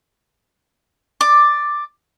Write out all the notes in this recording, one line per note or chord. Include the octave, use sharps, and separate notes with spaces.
D5 D6